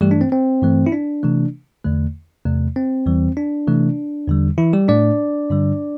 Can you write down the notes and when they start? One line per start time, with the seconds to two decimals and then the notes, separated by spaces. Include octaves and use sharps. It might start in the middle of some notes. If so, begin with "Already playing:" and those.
0.01 G2 E3 G3 A3 G4
0.11 D4
0.21 C4
0.32 C4
0.62 G2 E3 A3
0.86 E4
0.93 D4
1.23 C3 E3 A3
1.84 E2 D3 A3
2.45 E2 C3 A3
2.76 C4
3.06 E2 E3 G3
3.37 D4
3.67 C3 E3 A3
4.27 E2 D3 G3
4.58 E3 E4
4.73 G3 G4
4.88 A2 A3 D4 D5
5.50 G2 D3 G3